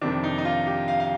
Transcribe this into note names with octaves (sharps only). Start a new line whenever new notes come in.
F2 C3 D#3 D4
D#4
D#4
F4
G4
F5
F5